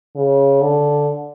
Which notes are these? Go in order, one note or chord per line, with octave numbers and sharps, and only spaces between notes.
C#3
D3